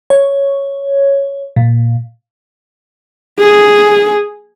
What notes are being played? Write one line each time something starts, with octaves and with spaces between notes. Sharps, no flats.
C#5
A#2
G#4